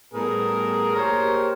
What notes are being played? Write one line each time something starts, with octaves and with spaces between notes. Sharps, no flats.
A2 G3 B3 G#4 A#4
A#3 G4 G#4 A#4 C5 C#5